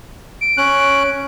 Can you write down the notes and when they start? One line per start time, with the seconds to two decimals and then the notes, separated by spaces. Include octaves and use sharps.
0.41 D7
0.58 C#4 F#6